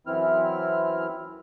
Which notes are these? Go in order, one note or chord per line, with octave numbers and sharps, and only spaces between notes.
F#2 E3 C4 E4 F6